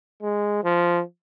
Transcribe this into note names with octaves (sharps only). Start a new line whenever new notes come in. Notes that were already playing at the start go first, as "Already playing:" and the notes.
G#3
F3